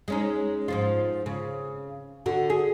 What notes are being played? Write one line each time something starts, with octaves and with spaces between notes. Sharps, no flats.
G#3 C#4 D#4
G#2 F3 F4
C#3
D3 F#4
G#4